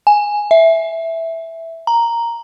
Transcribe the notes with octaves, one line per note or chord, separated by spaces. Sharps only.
G#5
E5
A#5